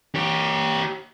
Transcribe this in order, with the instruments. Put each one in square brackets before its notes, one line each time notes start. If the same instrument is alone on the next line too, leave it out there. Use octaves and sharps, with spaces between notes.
[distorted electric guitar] G4 C#5